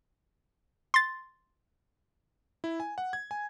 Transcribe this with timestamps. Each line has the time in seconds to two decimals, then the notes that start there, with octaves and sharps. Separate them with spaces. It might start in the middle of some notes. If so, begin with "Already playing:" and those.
0.94 C6 A6
2.64 E4
2.80 G#5
2.98 F#5
3.13 G#6
3.31 G#5